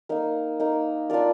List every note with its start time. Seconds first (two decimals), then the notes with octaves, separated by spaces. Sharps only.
0.09 A#3 D#4 A#4
0.60 A#3 D#4 A#4
1.10 D4 F4 A#4 D5